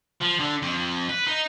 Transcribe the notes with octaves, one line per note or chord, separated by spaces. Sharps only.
F3
D3
F2
B4
D#4